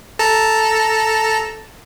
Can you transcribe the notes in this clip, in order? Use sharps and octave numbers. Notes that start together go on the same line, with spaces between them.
A4 A5 A#5